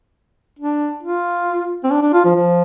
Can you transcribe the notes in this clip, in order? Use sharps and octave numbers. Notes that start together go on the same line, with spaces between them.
D4
F4
C4
D4
D4
F4
F3
F3